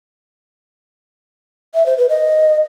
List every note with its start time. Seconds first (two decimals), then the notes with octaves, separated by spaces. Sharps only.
1.74 E5
1.86 C5
1.98 B4
2.10 D#5